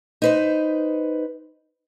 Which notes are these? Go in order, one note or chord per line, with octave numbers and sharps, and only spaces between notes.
D#4 B4 C5